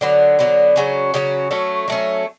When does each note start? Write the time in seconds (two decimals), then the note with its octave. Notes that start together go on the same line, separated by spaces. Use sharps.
0.01 D3 F#3 B3
0.39 D3 F#3 B3
0.76 C#3 F#3 C#4
1.14 C#3 F#3 C#4
1.51 F#3 A3 C#4
1.88 F#3 A3 C#4